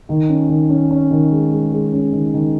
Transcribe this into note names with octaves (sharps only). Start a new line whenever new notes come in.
D#3
C#4
D#3
C#4
C#4
D#3
G#3
G#3
G#3
C#4
D#3
D#3